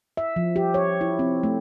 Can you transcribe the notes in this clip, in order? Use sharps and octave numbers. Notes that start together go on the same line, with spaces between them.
E5
F3
G4
C#5
E4
C4
A3